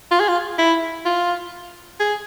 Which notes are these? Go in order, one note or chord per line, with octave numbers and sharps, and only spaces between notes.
F4
G#4
F4
E4
F4
G#4